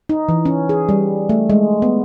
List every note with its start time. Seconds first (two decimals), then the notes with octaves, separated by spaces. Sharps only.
0.09 D#4
0.29 E3
0.45 C#4
0.69 G#4
0.89 G3
1.29 A3
1.50 G#3
1.82 B3